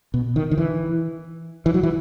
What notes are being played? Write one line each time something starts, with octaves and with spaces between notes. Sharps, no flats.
B2
D#3
D#3
E3
E3
F#3
E3